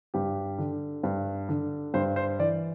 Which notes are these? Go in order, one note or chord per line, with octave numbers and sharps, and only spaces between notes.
G2 G4
D3
G2
D3
G2 C5
C5
E3 D5